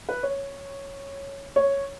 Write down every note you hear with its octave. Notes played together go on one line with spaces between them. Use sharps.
B4
C#5
C#5